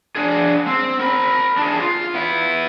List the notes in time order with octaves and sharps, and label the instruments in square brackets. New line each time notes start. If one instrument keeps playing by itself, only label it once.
[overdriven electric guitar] D4 G#4
C4
A#4 B5
D4 G#4
F4
B3 E4